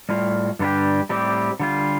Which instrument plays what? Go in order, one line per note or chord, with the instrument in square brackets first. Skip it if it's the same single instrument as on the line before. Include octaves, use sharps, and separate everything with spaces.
[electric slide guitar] A2 G3 F4
G2 D3 G3 D4 G4
A2 G3 C4 G4
D3 G3 F4